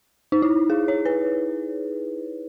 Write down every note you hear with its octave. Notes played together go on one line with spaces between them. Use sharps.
D#4
E4
G#4
C#5
B4